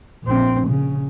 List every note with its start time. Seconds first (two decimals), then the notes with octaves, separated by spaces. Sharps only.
0.24 A#1 C4
0.68 C#3